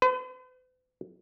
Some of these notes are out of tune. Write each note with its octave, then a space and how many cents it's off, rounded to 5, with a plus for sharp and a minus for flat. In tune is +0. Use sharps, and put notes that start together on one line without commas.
B4 +45